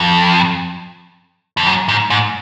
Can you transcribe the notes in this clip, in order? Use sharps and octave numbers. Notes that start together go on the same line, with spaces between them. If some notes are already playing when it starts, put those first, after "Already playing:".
Already playing: F2
F2
F#2
G#2
G#2